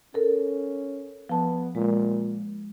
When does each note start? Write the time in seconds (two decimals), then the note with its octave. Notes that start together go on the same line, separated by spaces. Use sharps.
0.14 C#4 A4 A#4
1.29 F3 B3 A5
1.75 A#2 G#3